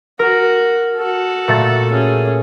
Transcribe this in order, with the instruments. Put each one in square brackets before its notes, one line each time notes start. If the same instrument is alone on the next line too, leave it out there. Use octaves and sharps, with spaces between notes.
[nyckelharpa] F#4 [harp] A#4
[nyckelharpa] F#4 A4
[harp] A#2 A3 A6
[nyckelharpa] C#4 G#4